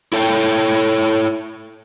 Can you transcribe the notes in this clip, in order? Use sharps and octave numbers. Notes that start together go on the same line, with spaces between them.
E4 A4 C#5 G5